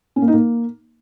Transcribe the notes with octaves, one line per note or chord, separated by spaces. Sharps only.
C#4
A#3
D#4
A#3